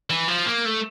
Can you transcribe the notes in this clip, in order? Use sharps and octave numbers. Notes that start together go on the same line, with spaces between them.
E3
F3
A#3
A3